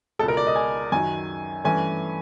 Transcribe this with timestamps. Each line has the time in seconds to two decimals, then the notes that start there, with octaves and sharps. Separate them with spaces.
0.19 C#2 B2 G#3 A4
0.28 A#4
0.37 D5
0.47 D#5
0.56 G#5
0.92 F#2 D#3 F#3 G#5
1.64 G2 E3 A3 C#4 G#5